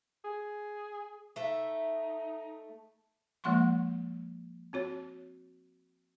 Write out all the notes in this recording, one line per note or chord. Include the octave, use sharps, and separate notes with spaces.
G#4
A3 D#4 E5
F3 G#3 A#3 F#5 C6 C#6
C4 F#4 C#5